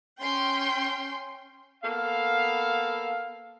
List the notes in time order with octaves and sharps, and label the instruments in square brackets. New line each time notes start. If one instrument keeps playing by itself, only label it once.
[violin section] C#4 G5 C6
[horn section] A#3 B3 A4 F5